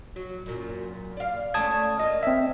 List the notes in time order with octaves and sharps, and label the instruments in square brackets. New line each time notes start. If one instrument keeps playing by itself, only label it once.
[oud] F#3
F#2 A#2
D5 F5
[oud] A3 C#4 D5 [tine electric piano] A5 D#6 G#6
[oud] A#3 F4 [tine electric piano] D#5
[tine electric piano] C4 E5